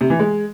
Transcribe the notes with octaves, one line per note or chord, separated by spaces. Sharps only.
C3
E3
G#3